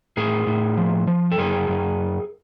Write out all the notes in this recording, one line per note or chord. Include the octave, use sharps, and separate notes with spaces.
A2 G#4 A#4
A2
F3
F3
A4
F#2 G#4 A#4
F#2